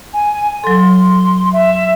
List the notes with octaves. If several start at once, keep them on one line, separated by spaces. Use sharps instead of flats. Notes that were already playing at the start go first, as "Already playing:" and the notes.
G#5
F#3 A4 C6
E5